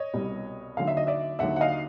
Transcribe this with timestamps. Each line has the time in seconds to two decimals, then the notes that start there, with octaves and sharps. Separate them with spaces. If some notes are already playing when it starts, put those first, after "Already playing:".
Already playing: C#5 D#5
0.13 C2 B2 G3
0.77 D#2 D3 F#3 F5
0.87 E5
0.97 D#5
1.07 D5 E5
1.39 D#2 D3 F#3 E5 F#5
1.56 F#5
1.61 D#5 F5